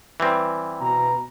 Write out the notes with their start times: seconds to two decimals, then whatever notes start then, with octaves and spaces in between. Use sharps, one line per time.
0.20 E3 G3 C4
0.81 B2 A#5